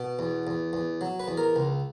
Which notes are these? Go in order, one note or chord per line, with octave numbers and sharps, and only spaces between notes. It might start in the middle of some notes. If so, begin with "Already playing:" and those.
Already playing: B2
E2
E2
E2
F#3
B4
E2
A#4
C#2